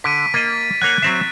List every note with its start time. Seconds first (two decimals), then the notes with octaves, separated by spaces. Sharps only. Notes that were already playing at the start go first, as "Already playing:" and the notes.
0.04 D3 B6 D7 D#7
0.34 A#3 D#5 A6
0.82 A#3 C#5 F#5 F#6
1.02 F#3 C4 E5